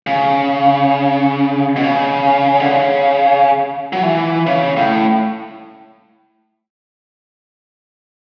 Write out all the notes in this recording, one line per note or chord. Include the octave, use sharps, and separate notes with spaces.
C#3
B2
C#3
D3
C#3
F#3
E3
C#3
A2